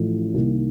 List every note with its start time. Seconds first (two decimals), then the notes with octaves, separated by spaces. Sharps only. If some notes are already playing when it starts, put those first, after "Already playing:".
Already playing: A1 A2 F3 A3
0.34 C2 C3 D#3 A#3 D#4